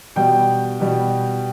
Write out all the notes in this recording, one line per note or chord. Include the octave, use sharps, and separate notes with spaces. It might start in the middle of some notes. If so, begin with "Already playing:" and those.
B2 G3 G5
B2 G3